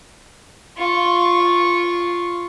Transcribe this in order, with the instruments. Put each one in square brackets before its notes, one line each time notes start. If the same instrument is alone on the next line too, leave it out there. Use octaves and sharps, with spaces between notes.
[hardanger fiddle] F4 C#6